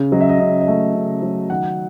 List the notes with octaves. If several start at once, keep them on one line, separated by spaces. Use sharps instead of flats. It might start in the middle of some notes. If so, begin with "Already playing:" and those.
Already playing: C#3
F#3 D#5
E5
D#5
C#3 D#5
D#5
A3 E5
C#3
F#3
D#3 F#5